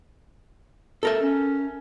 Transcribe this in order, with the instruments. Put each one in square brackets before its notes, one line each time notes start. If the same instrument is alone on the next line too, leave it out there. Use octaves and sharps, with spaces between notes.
[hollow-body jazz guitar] A4 A#4 E5
[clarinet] C#4